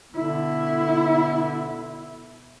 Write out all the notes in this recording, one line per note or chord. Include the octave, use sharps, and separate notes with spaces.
B2 D3 E4